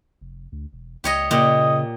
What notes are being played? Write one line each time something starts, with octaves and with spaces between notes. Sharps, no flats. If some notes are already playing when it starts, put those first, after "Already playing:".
F1
D2
E1
C#2 G4 C#5 D#5
A#2 C#3 G4 D#5